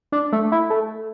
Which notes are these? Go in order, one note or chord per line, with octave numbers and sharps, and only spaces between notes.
D4
A3
E4
A3